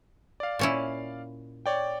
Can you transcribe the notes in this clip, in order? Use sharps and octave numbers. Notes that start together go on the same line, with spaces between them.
D5 F5
A#2 C#4 E4
C#5 D5 G5